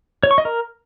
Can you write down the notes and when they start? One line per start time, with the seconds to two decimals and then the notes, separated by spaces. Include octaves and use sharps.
0.23 C#5
0.31 C#6
0.38 D#5
0.45 A#4